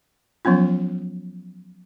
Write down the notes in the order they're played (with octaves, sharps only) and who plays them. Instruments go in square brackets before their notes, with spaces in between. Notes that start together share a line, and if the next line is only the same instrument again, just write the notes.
[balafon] F3 F#3 B3 C#4 F4